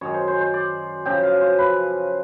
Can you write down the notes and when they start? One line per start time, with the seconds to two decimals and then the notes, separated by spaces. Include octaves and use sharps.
0.01 F#2 D#3 G#3 C#5
0.14 C5
0.28 C5
0.41 C5
0.54 D5
1.05 F#2 C#3 F3 G5
1.23 F5
1.41 C5
1.58 B4